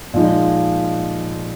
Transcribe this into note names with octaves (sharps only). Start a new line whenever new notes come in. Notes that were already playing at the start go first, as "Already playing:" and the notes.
A#2 F3 G#3 D#4